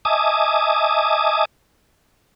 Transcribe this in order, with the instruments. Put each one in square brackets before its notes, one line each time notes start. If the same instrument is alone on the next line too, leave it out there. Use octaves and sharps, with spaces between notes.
[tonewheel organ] D#5 E5 G#5 A5 D6 D#6